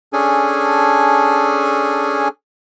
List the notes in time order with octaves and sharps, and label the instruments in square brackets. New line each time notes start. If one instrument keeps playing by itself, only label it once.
[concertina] C#4 D4 G#4 A4 G#5